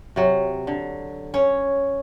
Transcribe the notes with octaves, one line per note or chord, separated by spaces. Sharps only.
C3 F#3
D3
C#4 C#5